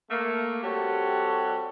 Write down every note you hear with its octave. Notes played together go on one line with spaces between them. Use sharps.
A3 A#3
G3 C4 F#4 G4 A4 C#5